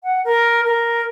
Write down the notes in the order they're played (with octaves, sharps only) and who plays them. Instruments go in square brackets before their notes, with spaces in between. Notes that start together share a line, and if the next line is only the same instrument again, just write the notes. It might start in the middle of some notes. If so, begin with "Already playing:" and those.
[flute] F#5
A#4
A#4